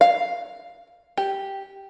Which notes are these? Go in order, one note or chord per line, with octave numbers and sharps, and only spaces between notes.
F5
G4